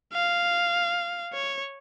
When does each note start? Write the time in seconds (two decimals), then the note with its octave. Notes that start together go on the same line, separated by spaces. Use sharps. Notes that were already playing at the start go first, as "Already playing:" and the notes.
0.13 F5
1.33 C#5